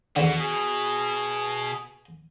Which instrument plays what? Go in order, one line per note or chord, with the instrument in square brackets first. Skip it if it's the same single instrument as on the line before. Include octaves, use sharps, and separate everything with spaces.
[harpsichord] E2 D3 [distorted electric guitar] B2
[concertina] G#4